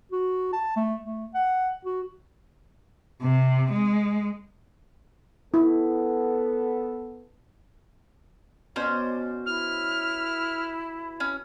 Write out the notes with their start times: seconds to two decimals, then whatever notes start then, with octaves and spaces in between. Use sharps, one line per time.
0.12 F#4
0.53 A5
0.76 A3
1.03 A3
1.34 F#5
1.85 F#4
3.22 C3
3.73 G#3
5.54 B3 E4 A4
8.76 B2 C#4 C5 D5
9.46 E4 F6
11.20 C#4